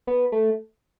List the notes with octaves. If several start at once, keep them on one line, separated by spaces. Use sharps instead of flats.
B3
A3